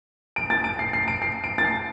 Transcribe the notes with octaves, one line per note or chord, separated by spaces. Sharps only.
D7
A6
D7
C7
C7
D7
C7
D7
A6
C7